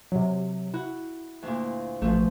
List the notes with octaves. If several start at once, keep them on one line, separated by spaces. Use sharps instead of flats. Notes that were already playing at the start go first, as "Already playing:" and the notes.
C3 F#3
E4 F#4
D2 A#2
A1 B2 F3 A3